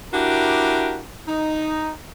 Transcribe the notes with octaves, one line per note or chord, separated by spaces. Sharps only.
D4 E4 F#4 G4 A#4
D#4